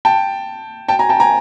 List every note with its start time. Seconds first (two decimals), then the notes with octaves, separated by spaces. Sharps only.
0.05 G5 A5
0.88 G5 A5
0.99 G#5 A#5
1.09 G5 A5
1.20 G#5 A#5